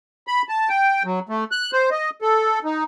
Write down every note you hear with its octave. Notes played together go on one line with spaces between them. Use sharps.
B5
A5
G5
F#3
A3
F#6
C5
D#5
A4
D#4